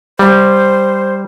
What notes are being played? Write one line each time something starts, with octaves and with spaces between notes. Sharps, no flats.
G3 C5